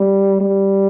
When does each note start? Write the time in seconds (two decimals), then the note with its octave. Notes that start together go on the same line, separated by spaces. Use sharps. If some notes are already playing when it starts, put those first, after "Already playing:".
Already playing: G3
0.40 G3